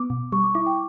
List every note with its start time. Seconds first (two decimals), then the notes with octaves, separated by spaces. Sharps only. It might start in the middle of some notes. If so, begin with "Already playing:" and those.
Already playing: B3 D6
0.10 B2
0.32 G3 C#6
0.43 D6
0.54 E4 D6
0.66 G5